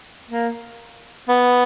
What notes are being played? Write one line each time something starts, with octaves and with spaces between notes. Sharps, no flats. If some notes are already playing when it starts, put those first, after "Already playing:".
A#3
B3